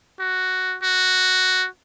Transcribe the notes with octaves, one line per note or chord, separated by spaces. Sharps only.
F#4
F#4